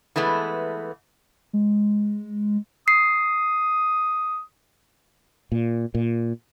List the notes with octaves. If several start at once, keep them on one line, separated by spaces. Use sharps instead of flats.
E3 G#3 A3 B3
G#3
D#6 C7
A#2
A#2